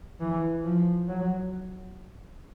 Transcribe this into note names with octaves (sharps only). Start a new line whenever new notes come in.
E3
F3
F#3